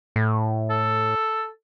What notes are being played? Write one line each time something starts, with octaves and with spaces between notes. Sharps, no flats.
A2
A4